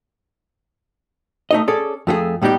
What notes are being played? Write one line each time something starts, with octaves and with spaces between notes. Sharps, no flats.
A3 D#4 D#5
C#4 G#4 A4 D5
F2 A3 F4 G#4
A2 G3 B3 D#4 G4